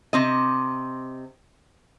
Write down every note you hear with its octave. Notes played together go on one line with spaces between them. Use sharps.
C3 C4 D#5